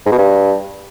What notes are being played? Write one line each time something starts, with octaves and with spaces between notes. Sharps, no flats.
G#2
B2
G2